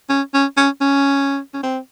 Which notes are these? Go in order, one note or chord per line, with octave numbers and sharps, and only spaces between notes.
C#4
C#4
C#4
C#4
C#4
C4